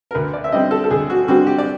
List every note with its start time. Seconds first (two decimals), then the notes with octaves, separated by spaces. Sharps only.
0.11 A#4
0.15 D2 B4
0.33 D5
0.44 E5
0.52 D3 G3 C4 D#5
0.71 A4
0.84 A4
0.91 D2 G#4
1.10 F#4
1.28 D3 G3 C4 F#4
1.47 G4
1.58 D5